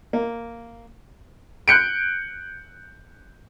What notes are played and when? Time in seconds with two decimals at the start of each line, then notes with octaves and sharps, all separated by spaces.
0.13 A#3
1.68 F#6 G6 C#7 D7